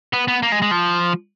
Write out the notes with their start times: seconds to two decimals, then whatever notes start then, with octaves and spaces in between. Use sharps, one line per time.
0.13 B3
0.28 B3
0.43 A#3
0.52 G#3
0.62 G#3
0.71 F3